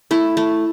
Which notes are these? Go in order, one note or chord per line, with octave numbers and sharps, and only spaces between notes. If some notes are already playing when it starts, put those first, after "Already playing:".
A3 E4
A3